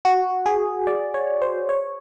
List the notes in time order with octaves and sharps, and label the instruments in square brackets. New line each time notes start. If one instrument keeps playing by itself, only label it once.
[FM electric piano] F#4
G#4
D5
C#5
C5
C#5